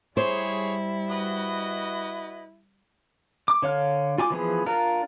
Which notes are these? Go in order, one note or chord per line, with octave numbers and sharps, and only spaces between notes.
G3 E4 G#4 C5 C#5
F#4 B4 D#5
D6
D3 C#5 F5 F6
F4 G#5 D6
E3 F3 B3 G#4
D4 F4 A#4